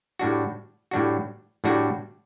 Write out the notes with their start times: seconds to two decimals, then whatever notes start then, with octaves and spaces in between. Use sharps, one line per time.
0.19 A2 G3 D4 F#4
0.91 A2 G3 D4 F#4
1.64 A2 G3 D4 F#4